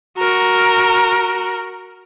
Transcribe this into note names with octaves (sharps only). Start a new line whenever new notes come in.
F#4 A#4